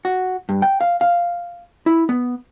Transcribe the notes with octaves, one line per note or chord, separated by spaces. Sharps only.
F#4
G2
G5
F5
F5
E4
B3